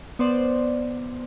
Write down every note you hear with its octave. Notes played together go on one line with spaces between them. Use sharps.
B3 C5 D5